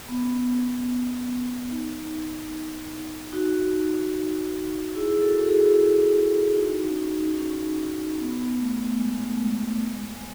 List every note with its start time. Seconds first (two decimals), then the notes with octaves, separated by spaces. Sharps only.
0.09 B3
0.22 C#4
0.34 B3
1.71 D#4
3.33 D#4 F#4
4.95 E4 G#4
5.22 F#4 A4
5.41 F#4
5.49 E4 G#4
6.57 D#4 F#4
6.89 C#4
6.97 D#4
7.31 D#4
7.37 C#4
8.20 B3
8.60 A3
8.99 G#3
9.32 A3
9.40 G#3
9.80 G#3
10.17 G#3